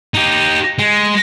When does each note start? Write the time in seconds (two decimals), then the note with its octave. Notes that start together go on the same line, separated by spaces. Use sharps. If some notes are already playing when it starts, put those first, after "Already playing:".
0.14 D#4 G4
0.78 G#3